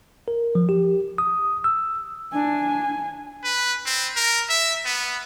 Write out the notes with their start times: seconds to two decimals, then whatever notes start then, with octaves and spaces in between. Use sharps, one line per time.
0.28 A#4
0.55 F3
0.69 G4
1.18 D#6
1.64 E6
2.33 D4 G#5
3.44 B4
3.86 C4
4.16 A#4
4.49 E5
4.86 B3